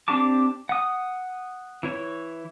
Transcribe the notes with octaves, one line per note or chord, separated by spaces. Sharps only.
C4 D4 G4 A5 D6
F#5 D#6
E3 E4 C#5